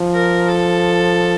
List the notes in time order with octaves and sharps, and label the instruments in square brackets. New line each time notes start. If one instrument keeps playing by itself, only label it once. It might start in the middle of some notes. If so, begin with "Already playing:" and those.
Already playing: [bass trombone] F3
[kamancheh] A#4
A4